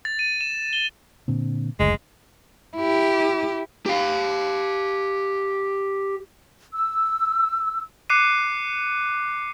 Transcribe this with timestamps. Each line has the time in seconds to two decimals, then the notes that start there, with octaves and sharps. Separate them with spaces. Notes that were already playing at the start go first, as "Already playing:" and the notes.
0.05 A6
0.19 D#7
0.41 E7
0.73 G7
1.28 A#2 D3 C4
1.80 F#1 D2 G#3
2.76 E4 G4
3.86 G4 F5
6.74 E6
8.10 D6 F#6 C7 C#7 D#7